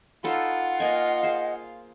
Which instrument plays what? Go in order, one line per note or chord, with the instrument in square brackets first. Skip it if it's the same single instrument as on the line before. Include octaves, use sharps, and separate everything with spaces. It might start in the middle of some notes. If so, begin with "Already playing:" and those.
[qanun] D#4 A4 B4 [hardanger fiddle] F4 F5 [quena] F#5
[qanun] A#3 A#4 G#5 [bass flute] D#5
[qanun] G#4 C5